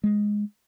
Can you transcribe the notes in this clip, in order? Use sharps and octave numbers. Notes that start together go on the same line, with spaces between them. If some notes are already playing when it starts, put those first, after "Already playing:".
G#3